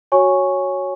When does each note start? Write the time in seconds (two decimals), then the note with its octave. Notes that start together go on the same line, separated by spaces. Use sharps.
0.12 F#4 C#5 G#5 C#6